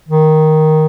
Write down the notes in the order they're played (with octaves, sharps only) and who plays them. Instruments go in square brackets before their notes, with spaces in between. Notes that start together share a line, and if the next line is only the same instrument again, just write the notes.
[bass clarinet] D#3